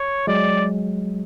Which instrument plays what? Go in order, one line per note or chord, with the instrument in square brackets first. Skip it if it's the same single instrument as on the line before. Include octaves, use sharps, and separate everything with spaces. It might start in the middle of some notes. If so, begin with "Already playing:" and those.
Already playing: [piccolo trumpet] C#5
[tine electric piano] F#3 G#3 [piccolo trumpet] D5